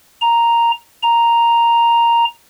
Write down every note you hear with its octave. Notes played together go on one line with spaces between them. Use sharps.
A#5
A#5